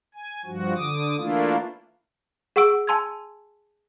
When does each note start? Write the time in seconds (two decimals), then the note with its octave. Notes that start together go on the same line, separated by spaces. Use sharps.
0.15 G#5
0.45 G2 F3 F#4
0.76 D3 D6 D#6
1.17 E3 A3 A#3 D4 E4 F4
2.56 G#4 F#5 C#6 E6 D7
2.87 G#5 A5 C6 E6 G#6